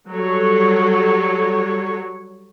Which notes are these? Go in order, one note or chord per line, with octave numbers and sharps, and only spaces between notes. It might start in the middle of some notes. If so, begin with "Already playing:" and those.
F#3 G3 A4 C#5